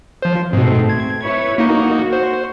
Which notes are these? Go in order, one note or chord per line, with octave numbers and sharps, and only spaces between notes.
F3 C5
G#2 B2 A3 C4
G#6
E4 B4 C#5
A#3 D#4 F#4
C5